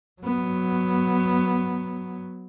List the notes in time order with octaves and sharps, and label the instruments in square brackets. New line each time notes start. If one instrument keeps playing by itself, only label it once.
[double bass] F#3 B3